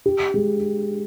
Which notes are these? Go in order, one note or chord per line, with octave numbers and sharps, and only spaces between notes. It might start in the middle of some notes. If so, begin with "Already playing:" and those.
G4
G#3